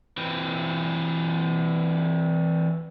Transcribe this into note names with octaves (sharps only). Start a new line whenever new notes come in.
E3 C4